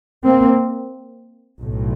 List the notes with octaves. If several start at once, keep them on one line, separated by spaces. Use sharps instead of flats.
A#3 C4
B1 A2